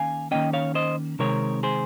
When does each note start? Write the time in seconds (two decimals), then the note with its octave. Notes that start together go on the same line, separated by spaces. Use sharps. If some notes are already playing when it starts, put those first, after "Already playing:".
Already playing: D#3 A#3 C#4 F5 G#5
0.31 D#3 A#3 C#4 D#5 G5
0.53 C#5 F5
0.75 C5 D#5
1.19 C3 D#3 G#3 C4 A#4 C#5
1.63 G#4 C5